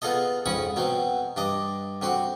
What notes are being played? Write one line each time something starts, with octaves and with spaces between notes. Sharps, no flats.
B3 F4 G#4 A4 D#5
F2 G#2 C#4 B5 C#6 D#6
B2 F#3 C4
G2 D4 D#5
D3 C4 F#4